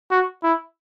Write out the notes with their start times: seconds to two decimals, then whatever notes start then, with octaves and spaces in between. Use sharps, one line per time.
0.11 F#4
0.43 E4